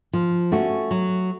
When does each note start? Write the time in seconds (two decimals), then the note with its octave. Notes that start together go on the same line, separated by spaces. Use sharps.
0.13 F3
0.52 A3 C#4 F#4
0.91 F#3